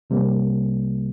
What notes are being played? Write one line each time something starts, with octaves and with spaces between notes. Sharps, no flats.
C2 C3 G3 A#3